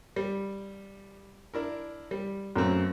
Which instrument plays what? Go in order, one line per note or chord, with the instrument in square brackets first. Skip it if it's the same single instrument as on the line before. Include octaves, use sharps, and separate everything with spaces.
[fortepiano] G3
D4 E4 A#4
G3
[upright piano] F#2 [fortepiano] A3 A#3 C4